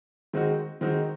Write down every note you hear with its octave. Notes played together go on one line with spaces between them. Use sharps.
D#3 G#3 C4 D#4 F#4
D#3 G#3 C4 D#4 F#4